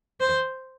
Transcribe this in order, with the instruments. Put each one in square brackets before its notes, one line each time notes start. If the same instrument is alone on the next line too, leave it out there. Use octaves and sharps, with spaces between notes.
[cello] C5